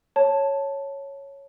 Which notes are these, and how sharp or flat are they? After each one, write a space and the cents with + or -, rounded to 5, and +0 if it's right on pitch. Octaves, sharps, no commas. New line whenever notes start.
C#5 +0 A5 +0